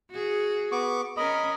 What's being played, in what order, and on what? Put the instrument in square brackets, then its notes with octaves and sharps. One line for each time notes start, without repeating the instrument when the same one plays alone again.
[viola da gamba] F#4 G#4
[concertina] B3 C#6 D6
[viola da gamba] C#4 A#4 [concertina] D#5 B5